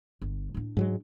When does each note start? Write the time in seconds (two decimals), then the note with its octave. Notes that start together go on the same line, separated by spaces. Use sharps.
0.22 G1
0.54 A2 D4
0.77 G#2 F#3 G#3